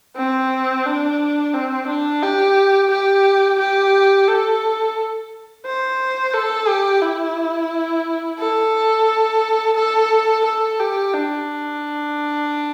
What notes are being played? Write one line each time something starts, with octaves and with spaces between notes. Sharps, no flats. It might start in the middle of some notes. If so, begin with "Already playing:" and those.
C4
D4
C4
D4
G4
G4
G4
A4
C5
A4
G4
E4
A4
A4
A4
G4
D4